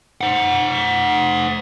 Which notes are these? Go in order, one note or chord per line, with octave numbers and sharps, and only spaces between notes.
C5 F#5